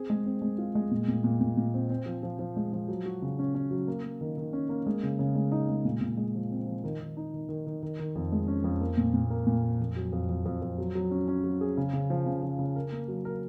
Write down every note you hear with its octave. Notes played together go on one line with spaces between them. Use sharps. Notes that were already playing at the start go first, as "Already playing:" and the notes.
Already playing: C4 G#4
G#3
C4
G#3
F4
G#3
A#2
A#2
A#2
A#2
A#2
C4
C4
F3
F3
F3
G#3
F3
F#3
F#4
C#3
C#4
C#4
F#3
A#3
A#3
D#3
D#3
C#4
A#3
G#3
C#3
C#3
G#3
D#4
G#3
A#2
A#2
G#3
F3
C4
F3
D#3
D#3
D#4
D#3
D#3
D#3
D#3
D#3
F2
G#3
C#4
F2
A#3
A#2
A#2
A#3
A#2
A#3
F2
F#3
F2
F2
F2
F2
F#3
F#3
C#4
C#4
F#3
G#4
C#3
C#3
F3
C#3
F3
C#3
A#4
A#3
F#3
A#4